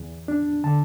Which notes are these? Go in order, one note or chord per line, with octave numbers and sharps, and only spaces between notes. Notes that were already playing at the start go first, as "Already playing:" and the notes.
Already playing: E2
D4
D3 A5